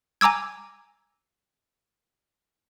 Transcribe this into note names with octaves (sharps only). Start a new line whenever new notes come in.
G#5 A#5 D6 E6 G#6